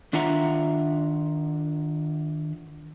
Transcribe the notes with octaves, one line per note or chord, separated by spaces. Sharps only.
D#3 D4 F4 E5 F#5 A#5